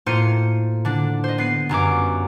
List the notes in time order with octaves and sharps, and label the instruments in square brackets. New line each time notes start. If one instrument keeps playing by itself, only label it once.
[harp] A2 A#3 F4 C5 C#7 D#7
D3 D4
C5 D#5
B3 C7 D#7
G1 F#2 C#4 D6